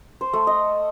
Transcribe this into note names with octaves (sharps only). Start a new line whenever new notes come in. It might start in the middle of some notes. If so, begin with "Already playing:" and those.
C5
A3
D#5